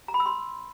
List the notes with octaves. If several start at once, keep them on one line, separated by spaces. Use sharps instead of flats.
A#5
B5
E6
C6